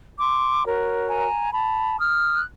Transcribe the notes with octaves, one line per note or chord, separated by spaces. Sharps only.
C6 D6
F#4 A#4 C#5
G#5 A#5
A5 B5
D#6 F6
F#6